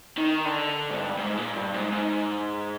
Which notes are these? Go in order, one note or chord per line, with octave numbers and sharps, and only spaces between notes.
D#3
D3
G#2
G2
G#2
A#2
G2
G#2
G#2